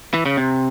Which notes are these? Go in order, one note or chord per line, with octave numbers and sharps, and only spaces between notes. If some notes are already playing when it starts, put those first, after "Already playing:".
E3
C#3
C3